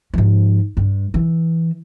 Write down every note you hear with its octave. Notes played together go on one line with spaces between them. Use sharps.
G#2 F3
G2
E3